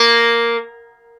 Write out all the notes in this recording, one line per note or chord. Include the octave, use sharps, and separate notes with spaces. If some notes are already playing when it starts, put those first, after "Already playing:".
Already playing: A#3